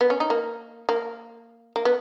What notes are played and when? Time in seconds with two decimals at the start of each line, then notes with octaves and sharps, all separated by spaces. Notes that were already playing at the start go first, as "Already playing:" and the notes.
0.01 B3
0.10 C#4
0.20 D#4
0.30 A#3
0.89 A#3
1.76 A#3
1.85 B3